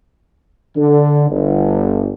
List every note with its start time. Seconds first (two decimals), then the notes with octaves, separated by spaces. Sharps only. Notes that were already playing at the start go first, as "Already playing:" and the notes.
0.76 D3
1.30 G1